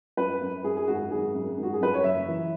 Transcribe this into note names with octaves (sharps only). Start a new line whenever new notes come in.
F#2 B4
F#2
F#2 G#4
G#4
G#1 F#4
G#1 G#4
F#2
G#1
F#4
G#4
F#2 B4
C#5
F#1 E5
E3